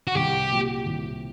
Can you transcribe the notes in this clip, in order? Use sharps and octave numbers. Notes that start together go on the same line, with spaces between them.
F#4
C2 G4
A#2 F#3
C2